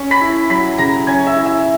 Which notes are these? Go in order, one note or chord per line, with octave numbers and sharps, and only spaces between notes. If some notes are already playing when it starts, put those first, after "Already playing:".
Already playing: C#4
B5 B6
E4
F#3 B5 B6
C#3 A#5 A#6
C#4 G#5 G#6
E5 E6
E4
E5 E6